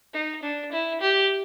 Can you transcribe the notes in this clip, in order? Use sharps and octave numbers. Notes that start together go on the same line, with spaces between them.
D#4
D4
E4
G4